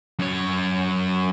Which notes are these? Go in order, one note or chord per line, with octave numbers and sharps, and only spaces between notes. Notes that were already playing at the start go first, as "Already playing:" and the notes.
F#2 C#5